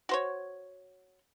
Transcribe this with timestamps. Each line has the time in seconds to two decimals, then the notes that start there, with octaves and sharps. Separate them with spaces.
0.09 F#4 C5 C#5